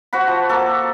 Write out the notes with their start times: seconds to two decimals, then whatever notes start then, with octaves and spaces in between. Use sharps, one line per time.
0.13 F#4 C5 F#5 B5
0.28 F3
0.49 A#3 F#4 A4